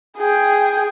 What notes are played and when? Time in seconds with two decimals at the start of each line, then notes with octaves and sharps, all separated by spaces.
0.17 G#4 G5